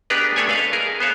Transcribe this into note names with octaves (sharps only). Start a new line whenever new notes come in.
B3 D4 G4 G#4 A#4 B4
A3 D4 A4 C#5 D5 G#5
B4 D#5 F5
G#4 A#4
B3 C5 C#5 F5